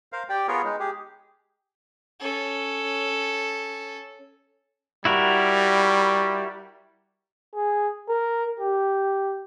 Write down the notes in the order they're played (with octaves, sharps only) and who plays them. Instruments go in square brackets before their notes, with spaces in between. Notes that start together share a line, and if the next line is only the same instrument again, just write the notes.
[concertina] A#4 C5 F5
G4 D5 G5
B3 F4 G#4 A#4 C#5
G#3 D#4
G4 G#4
[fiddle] C#4 A4
[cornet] G3 [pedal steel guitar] E4 F#4 A#4
[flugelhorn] G#4
A#4
G4